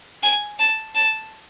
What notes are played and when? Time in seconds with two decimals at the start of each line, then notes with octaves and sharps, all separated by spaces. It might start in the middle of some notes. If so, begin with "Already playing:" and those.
0.23 G#5
0.59 A5
0.95 A5